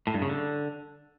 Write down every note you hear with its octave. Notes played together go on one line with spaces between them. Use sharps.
A2
G2
C#3
D3